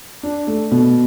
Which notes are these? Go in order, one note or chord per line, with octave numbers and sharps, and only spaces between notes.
D4
A3
B2